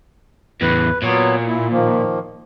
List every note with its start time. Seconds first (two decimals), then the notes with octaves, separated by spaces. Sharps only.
0.62 E2 A2 B4
1.03 A#2 F#3 B3 C#5
1.46 E4
1.71 D#3 F3 A#3